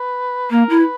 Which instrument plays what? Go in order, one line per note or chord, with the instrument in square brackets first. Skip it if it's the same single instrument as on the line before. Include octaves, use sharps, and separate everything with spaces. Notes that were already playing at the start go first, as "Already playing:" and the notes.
Already playing: [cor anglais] B4
[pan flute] A#3 [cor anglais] A#4
[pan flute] E4
[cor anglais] B4